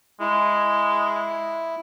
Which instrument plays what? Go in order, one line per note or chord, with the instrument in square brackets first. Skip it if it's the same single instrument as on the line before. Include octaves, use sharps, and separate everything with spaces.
[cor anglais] G#3 [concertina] E4